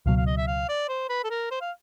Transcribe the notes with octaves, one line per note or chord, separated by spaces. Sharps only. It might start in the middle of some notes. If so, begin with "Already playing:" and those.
C#2 B2 F#3 F5
F5
D#5
E5
F5
D5
C5
B4
A4
A#4
C5
F5